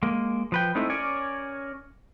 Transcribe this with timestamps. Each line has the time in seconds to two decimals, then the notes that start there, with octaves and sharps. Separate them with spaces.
0.03 G#3 A#3
0.52 F3 B4 G5
0.75 G#3 A3 C4 D#4 E4
0.90 C#4 A#4 C#5 D5 G#5